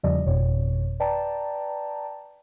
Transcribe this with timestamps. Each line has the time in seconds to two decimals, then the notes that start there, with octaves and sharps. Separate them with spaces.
0.03 E2 C#3 F3 G3 D5 D#5
0.26 G1 F2 B2 C#5
1.00 B4 D5 G5 A5 A#5